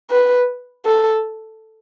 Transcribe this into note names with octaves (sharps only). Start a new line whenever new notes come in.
B4
A4